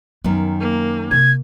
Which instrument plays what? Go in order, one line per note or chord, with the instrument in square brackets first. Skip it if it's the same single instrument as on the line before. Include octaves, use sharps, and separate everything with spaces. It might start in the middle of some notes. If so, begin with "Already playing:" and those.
[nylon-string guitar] F#2 D#3 [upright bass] B3
[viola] A#3
[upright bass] C3 [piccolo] G#6